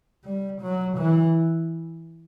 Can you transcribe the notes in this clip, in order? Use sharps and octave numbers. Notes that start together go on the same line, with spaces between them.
G3
F#3
E3